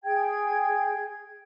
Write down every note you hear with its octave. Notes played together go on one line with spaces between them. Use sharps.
G#4 G5 G#6